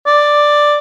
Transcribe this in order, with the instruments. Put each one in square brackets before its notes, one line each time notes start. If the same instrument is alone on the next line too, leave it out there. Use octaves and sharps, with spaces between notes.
[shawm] D5